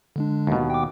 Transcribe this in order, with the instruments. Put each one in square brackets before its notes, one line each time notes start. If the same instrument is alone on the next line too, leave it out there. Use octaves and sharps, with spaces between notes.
[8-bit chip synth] D3 G#3 D4
[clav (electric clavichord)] D#2 B2
[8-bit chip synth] G5 D6